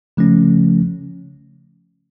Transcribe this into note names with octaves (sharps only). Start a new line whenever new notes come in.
C#3 F3 A3 C#4